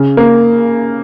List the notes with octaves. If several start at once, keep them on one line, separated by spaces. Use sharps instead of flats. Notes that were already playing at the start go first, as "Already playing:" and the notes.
Already playing: C#3
A#3